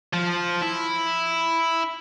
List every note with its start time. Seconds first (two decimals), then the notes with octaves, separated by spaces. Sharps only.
0.14 F3
0.61 E4